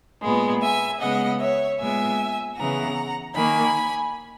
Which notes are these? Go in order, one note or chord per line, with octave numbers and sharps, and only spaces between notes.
A#2 G#3 B3
E5 G#5
C#3 G#3 B3 D#5 F#5
C#5 E5
A#2 G#3 B3 E5 G#5
C#3 E3 B3 F#5 A#5
D#3 A#3 G#5 B5